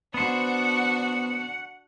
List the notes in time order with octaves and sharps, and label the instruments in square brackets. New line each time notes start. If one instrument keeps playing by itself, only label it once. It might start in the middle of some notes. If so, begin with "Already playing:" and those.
[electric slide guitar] B3 C5 [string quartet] D4 F#4 [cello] F#5